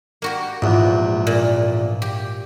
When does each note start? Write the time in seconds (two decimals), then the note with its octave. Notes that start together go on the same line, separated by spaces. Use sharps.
0.22 A#3 F#4 G4
0.62 A#1 E2 G#2
1.27 A#2
2.02 G4